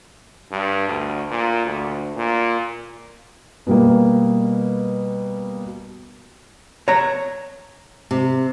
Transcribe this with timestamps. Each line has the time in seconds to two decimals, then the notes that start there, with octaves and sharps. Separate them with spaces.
0.51 G2
0.89 D2
1.31 A#2
1.66 D2
2.16 A#2
3.67 B2 G3 A#3
6.88 C#5 A5 A#5
8.11 C3